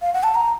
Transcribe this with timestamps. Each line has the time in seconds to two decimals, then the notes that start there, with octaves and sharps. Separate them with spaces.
0.02 F5
0.14 F#5
0.23 A5
0.35 A#5